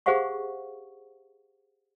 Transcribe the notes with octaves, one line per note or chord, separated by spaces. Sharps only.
G4 G#4 C5 F5 F#5 C#6